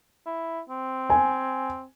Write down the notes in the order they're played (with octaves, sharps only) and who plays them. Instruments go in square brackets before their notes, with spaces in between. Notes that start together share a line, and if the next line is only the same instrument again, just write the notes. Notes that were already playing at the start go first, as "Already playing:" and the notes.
[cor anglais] E4
C4
[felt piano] G#5